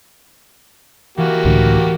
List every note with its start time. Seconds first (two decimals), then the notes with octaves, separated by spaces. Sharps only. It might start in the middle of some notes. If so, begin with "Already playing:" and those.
1.18 E3 A#3 F#4 G4
1.45 C#2 A2 D3